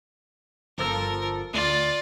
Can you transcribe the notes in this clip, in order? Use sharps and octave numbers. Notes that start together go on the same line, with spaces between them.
G1 F3 A4 A#4
D2 F4 D5